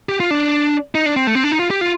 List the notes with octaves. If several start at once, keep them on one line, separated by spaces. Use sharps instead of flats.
G4
F4
D4
D#4
D4
C4
A3
C4
D4
D#4
F4
G4
F4